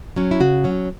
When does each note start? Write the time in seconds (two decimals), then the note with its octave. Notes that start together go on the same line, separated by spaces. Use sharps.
0.16 F#3 C#4
0.31 E4
0.40 C#3 F#4
0.64 F#3 C#4